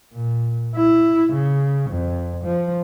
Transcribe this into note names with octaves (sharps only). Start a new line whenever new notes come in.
A#2
E4
C#3
F2
F3